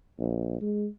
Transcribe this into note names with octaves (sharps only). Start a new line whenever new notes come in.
A#1
G#3